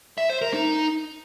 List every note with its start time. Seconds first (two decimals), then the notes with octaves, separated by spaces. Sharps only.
0.18 E5
0.30 C5
0.42 A#4
0.54 D#4